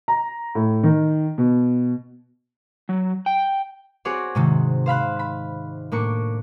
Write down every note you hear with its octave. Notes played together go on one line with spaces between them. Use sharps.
A#5
A2
D#3
B2
F#3
G5
C4 F#4 G#4 C#5 D5
G#2 C3 D#3
C5 F5 B5 F#6
B5
A2 A#3 D4 C#6